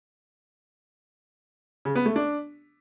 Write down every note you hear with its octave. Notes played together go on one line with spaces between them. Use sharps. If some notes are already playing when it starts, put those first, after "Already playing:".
C#3
B3
A3
D4